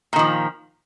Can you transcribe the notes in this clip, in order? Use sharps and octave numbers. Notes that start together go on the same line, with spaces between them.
A#2 D#3 F3